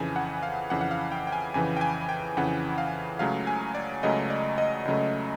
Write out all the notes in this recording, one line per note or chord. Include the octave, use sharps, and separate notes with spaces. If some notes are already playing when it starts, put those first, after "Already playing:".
Already playing: F2 C#3 E3 G#5
F#5
F5
F2 C#3 E3 F#5
F#5
F5
G5
G5
G#5
F2 C#3 E3 G#5
G5
G#5
G5
F2 C#3 E3 F#5
F5
C#2 C#3 F#3 A3 F5
G#5
D5
C#2 C#3 F#3 A3 D#5
D5
D#5
C#2 C#3 F#3 A3